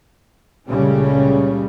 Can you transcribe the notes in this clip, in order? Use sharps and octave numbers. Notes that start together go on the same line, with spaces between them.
C#2 A#2 C#3 G3 A3 C#4